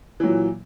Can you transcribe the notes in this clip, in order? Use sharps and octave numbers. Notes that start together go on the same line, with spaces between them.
A#2 E3 F#3